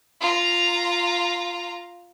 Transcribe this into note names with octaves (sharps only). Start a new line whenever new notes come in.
F4 A#5